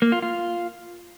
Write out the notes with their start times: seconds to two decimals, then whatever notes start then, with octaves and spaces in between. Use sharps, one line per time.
0.02 A#3
0.12 F4
0.22 F4